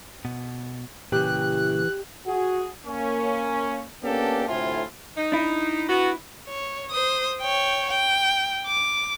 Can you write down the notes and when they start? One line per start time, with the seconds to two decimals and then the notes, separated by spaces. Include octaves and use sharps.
0.25 B2
1.12 A#2 C#3 E3 G4 F#6
2.27 F#4 G#4
2.86 A#3 C#4
4.03 A#3 B3 C#4 D4 G4 A4
4.47 D2 A2 C3 E4 F4 G#5
5.17 D#4
5.32 D4 E4
5.89 B3 F#4
6.48 C#5
6.91 C5 D#6
7.42 C#5 G5
7.90 G5
8.67 D6